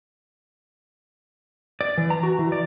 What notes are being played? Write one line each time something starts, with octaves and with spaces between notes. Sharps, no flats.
D5
E3
A#5
F#4
E3
D5